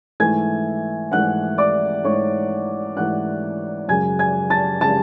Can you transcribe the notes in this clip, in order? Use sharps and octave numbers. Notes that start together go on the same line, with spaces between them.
G#2 E3 A3 G#5 G#6
G#2 E3 A3 F#5 F#6
D5 D6
G#2 E3 A3 C#5 C#6
G#2 E3 A3 F#5 F#6
F#2 C#3 G#3 G#5 G#6
G#5 G#6
A5 A6
C#3 G#3 A5 A6